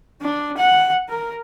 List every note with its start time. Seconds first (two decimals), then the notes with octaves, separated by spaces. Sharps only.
0.21 D4
0.57 F#5
1.08 A#4